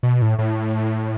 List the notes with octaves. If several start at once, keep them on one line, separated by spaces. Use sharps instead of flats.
B2
A2
A2